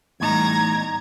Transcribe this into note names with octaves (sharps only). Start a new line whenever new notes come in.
E2 A2 G3 D#4 A#5 G#6